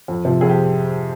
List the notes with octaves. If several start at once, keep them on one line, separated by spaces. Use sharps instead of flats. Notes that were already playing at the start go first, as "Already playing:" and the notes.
F2
C3 F3
F2 G#4
G4